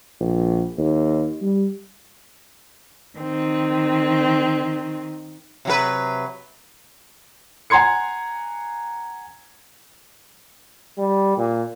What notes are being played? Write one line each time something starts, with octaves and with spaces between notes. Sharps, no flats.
A#1
D#2
G3
D#3 C4
C3 F#3 B4
F#5 G#5 A#5 C6 G#6 C#7
G3
A#2